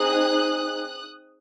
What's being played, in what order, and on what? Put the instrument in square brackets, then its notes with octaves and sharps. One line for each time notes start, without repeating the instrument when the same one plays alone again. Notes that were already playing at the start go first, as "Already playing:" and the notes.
Already playing: [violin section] C4 D#4 G#4 D#6 F#6